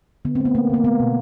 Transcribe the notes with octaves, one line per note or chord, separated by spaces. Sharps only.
D3 B3
C4
A3
B3
A3 A#3
D3 A#3
A3 B3
B2